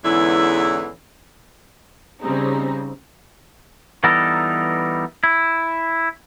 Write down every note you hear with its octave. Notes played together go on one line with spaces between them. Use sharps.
E2 G#2 D3 E3 C#4 E4
C#3 G3 C4 D#4
E3 G3 B3 D#4 A4 A#4
E4